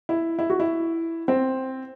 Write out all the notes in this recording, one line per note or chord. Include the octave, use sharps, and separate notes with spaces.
E4
E4
F#4
E4
C4